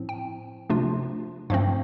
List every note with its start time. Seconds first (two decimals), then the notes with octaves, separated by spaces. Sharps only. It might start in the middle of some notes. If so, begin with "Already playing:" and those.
Already playing: A2 F3 C4
0.09 G5
0.70 C3 F3 A3 D4 F4
1.50 G2 F3 A3 C4 F5